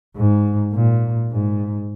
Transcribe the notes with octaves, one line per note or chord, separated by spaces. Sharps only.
G#2
A#2
G#2